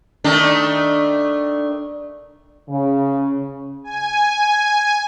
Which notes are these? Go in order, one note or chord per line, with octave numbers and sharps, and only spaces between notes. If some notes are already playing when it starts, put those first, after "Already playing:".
D#3 A3 D4
C#3
G#5